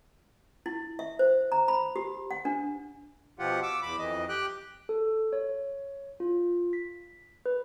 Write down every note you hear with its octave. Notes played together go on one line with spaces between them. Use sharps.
E4
E5
C5
A#5
B5
G4
F#5
D4
B2 F3 F4 G4 F#5
D6 E6
E2 B5 D6
F2 E3 D#5
G4 G5 F#6
A4
C#5
F4
B6
B4